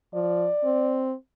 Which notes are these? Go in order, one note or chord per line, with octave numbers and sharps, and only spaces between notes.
F3 D5
C4